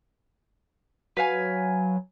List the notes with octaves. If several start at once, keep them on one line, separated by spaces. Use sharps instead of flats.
F#3 B4 F5 G#5